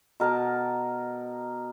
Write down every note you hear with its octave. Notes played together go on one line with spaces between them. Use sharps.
B2 A#4 A5 A#5